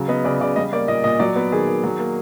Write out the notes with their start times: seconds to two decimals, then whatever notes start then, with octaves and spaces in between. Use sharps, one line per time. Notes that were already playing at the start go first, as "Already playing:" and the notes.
Already playing: C#3 F#3
0.08 B3 D#5
0.25 C#3 D5
0.40 C#3 D5
0.56 G3 D#5
0.73 A#3 D5
0.88 A#2 D#5
1.04 A#2 D#5
1.19 F#3 D5
1.36 B3
1.52 D#3 G#4
1.68 D#3
1.84 F#3
1.99 A#3